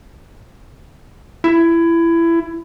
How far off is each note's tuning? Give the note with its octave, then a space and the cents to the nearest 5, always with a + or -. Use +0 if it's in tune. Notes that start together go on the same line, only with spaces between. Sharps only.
E4 +20